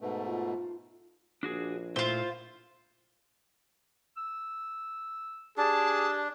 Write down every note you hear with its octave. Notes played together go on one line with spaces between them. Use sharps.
G#2 B2 A3 B4
F4
A#1 D4 F#4 G#4
A#2 A3 E4 F4 C5
E6
D4 G4 G#4 A5